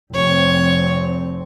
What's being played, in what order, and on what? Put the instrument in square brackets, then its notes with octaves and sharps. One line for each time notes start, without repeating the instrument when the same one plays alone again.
[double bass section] F1 C4 [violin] C#5